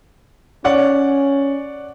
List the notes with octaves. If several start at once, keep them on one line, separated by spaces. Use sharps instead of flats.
C#4 C#5 D5 F#5